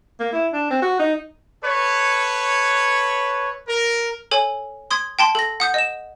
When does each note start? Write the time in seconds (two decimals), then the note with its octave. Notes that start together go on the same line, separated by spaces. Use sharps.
0.20 A#3
0.32 E4
0.52 D4
0.70 C4
0.82 F#4
0.99 D#4
1.64 A4 B4 C#5
3.68 A#4
4.31 A4 C#5 G#5
4.91 C6 D#6 G#6
5.19 G5 A5 C6
5.35 A4 A#6
5.60 F#5 D#6 G6
5.74 D#5 E7